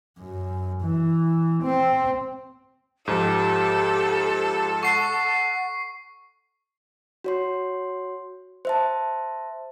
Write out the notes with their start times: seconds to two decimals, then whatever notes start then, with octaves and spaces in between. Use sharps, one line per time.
0.19 F#2
0.83 E3
1.63 C4
3.08 G#2 F3 G4 A4
4.83 F#5 C#6 C7
7.24 F#4 C#5 C6
8.65 C5 E5 A5